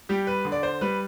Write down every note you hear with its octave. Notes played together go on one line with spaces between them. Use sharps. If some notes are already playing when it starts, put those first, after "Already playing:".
G3 G4
B4
D3
D5
C5
G3 B4